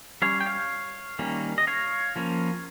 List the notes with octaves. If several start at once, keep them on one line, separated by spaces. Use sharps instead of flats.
G3 C#4 C#5 F5
G5
C#5 F5
D#3 G3 A#3 C#4
D#5
C#5 F5
F3 A#3 C#4